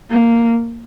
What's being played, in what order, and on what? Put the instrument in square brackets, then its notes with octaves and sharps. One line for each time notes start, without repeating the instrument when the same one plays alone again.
[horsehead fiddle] A#3